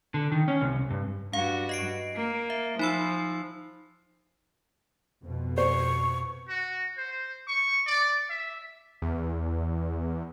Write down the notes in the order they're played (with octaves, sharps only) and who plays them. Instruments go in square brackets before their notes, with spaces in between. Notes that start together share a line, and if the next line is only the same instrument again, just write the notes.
[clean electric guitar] D3
D#3
C#4
C2
G2
[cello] G2 F#4 [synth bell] F5
[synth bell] D#5 C7 D7
[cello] A#3
[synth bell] E5
[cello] F3 [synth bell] D#4 B5 E6
[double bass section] F2 B2
[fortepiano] C5 [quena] C#6
[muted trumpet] F#4
C5
C#6
D5
E5
[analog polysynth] E2